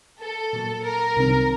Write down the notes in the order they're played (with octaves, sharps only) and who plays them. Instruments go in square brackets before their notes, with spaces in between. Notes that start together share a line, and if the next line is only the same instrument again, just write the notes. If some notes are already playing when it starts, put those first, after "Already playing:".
[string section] A4
[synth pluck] A#2 F#3 A#3
[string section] A#4
[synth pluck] C2 C3 D#3 G3 C4